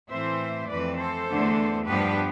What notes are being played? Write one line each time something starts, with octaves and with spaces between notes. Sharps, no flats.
A2 E3 A3 C4 C5 E5
F2 E3 A3 C4 B4 D5
A4 C5
E2 D3 A3 D4
G2 F3 B3 D4 G4 B4